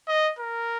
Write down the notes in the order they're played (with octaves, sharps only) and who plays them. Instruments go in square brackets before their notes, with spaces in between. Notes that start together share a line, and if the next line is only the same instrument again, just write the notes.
[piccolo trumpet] D#5
A#4